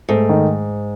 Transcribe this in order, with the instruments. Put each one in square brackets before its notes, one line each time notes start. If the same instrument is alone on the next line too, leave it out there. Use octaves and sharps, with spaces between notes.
[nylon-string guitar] G#2 [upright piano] A3
[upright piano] D#3